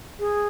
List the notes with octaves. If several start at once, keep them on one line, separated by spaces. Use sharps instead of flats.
G#4